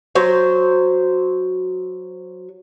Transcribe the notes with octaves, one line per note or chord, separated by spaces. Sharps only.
F#3 C5